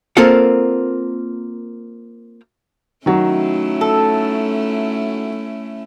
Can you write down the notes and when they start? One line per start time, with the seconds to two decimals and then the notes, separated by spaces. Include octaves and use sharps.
0.17 A#3 C4 F4 A4 A#4 F#5
3.06 D#3 F#3 A3 C#4 E4
3.81 A4